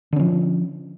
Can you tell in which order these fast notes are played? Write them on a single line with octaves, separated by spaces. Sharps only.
D3 C#4 F3